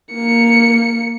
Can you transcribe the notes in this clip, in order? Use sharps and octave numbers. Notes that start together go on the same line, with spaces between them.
A#3 C#7